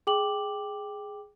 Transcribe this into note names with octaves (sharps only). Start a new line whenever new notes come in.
G#4 G5 D6 F#7